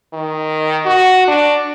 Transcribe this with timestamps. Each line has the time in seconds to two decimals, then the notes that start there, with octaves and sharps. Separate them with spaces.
0.14 D#3
0.85 F#4
1.28 D4